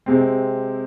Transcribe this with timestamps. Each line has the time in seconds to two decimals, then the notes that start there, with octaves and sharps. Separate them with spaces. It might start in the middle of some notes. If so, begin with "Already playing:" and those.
0.06 C3 G#3 C4